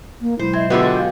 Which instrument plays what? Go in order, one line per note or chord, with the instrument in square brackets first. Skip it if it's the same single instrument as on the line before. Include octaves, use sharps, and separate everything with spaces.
[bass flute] A#3
[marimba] B2 F#3 G#3 [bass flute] E4 [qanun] C5
[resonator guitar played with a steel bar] C4 [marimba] D#5 E5 G#6
[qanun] B2 G4 G#5 [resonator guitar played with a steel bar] D3 A3 B3 [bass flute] F4
[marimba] F#5 A6
F5 G6